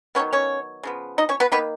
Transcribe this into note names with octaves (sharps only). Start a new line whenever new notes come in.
D#3 F#3 B3 C#4 C#5
C#4 C#5
C#3 F3 B3
D#4 D#5
C#4 C#5
B3 B4
D#3 A#3 B3 B4